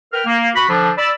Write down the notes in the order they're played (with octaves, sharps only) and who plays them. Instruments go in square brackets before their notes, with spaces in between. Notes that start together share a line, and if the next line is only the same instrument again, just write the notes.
[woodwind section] A#4 B4 G5 F6
A#3
F#4 B5
D3 F3 D4
D5 B5 E6